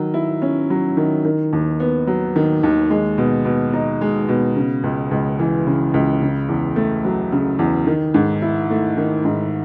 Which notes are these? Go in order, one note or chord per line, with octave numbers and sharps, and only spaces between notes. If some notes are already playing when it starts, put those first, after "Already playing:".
Already playing: D#3 F#3
E4
C#4
F#3
D#3
D#3
D#2
B3
F#3
D#3
D#2
G#3
B2
B2
D#4
G#3
B2
C#3
C#2
C#2
E3
C#3
C#2
C#3
E2
A3
F#3
C#3
E2
D#3
G#2
E4
A3
D#3
G#2